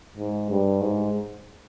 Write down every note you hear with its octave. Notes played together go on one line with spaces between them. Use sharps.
G#2
G2
G#2